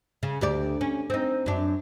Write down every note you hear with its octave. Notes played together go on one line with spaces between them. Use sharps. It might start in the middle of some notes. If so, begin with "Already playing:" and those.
C#3
D2 G4 D5
C#4
C4 D#4
F#2 D4